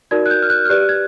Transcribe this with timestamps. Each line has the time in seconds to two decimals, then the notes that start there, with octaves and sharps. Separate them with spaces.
0.11 D#4 F#4 A#4 D5 G#6
0.26 F#6
0.30 G6
0.42 F6
0.50 F#6
0.65 F6
0.70 G4 B4 D5 F#6
0.89 G#6